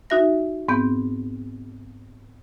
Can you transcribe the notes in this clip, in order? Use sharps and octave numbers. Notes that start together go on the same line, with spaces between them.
D#4 F#4 E5 A#6
G#2 B3 C4 G6